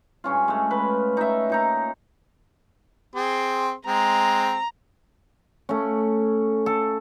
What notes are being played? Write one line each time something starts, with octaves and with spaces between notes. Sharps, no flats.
G2 C#4 F4
G#3 A3
B4
D#4 E5
A#2 D#4 A#5
C4 G#4 C6
G#3 C4 A#5
A3 C#4
A4